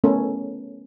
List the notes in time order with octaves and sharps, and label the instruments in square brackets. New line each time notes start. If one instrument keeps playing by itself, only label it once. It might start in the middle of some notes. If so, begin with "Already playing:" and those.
[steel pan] A3 B3 C#4 A4 A#4